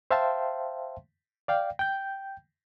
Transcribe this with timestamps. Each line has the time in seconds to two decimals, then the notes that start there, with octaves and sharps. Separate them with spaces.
0.11 C5 E5 F5 G5 A5 C6
1.48 D5 F5 G5
1.79 G5 G6